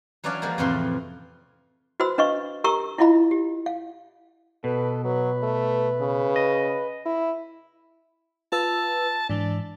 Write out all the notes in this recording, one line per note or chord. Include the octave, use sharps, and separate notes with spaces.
E3 F#3 C#4 D4 D5 F5
F3 G3 G#3 A#3
F2 A2 C3 E3 F4 C6
F#4 B4 C5 B5 E6
D4 B4 D#5 F5 C#6
G4 A#4 A#5 C#6 E6
E4 F4 D#5 F5 B5
G4
F5
B2 A4 B4
F#3 B4
A3
C#3
D#5
E4
F4 B4 A5 E6
G#2 E3 D4